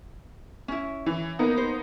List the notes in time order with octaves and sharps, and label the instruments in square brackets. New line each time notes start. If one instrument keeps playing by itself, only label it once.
[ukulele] C#4 E4
[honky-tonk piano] E3
A#3 B3 D#4
[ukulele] C5